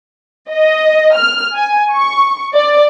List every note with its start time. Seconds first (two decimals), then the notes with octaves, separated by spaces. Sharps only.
0.51 D#5
1.15 F6
1.55 G#5
1.94 C#6
2.55 D5